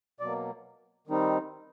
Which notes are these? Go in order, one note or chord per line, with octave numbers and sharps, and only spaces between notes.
B2 F#3 A#3 D5
D#3 G3 C4 D#4